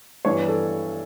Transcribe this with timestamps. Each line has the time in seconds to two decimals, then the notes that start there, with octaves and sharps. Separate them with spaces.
0.25 G2 E3 B3 D4 C#5
0.48 A4